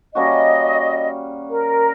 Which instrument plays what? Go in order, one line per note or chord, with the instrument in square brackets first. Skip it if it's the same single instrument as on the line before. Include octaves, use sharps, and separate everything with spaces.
[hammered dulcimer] G3 A#3 C#4 F#4 [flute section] D#5
[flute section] A#4